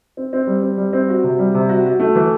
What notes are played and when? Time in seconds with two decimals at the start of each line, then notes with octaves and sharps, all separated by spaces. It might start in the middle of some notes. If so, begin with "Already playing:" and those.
0.17 C4
0.33 C4
0.47 G3
0.63 C4
0.77 G3
0.93 C4
1.09 F#4
1.24 C3
1.39 G3
1.54 C3
1.69 F#4
1.85 F#4
2.00 A3
2.15 E3